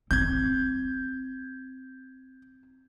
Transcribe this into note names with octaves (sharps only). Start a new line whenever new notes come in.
C4 G6 G#6